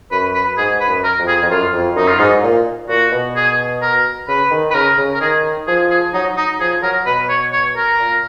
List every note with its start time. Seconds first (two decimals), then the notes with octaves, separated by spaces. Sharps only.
0.11 F#2 B4
0.34 B4
0.57 G#2 G#4
0.80 B4
0.88 F#2
1.04 A#4
1.20 F2
1.27 G#4
1.43 F2
1.50 F#2 F4
1.73 F2
1.96 F#2 D#4
2.08 F4
2.19 G#2 D#4
2.43 A#2
2.89 A#2 F#4
3.12 B2
3.35 G#4
3.81 A#4
4.28 C#3 B4
4.51 D#3
4.70 B4
4.74 C#3 A#4
4.98 C#3
5.13 A#4
5.21 D#3 G#4
5.67 F3 G#4
5.90 G#4
6.14 F#3 D#4
6.37 D#4
6.60 F3 G#4
6.82 F#3 A#4
7.06 B2 B4
7.29 C#5
7.52 C#5
7.76 A#4
7.99 A#2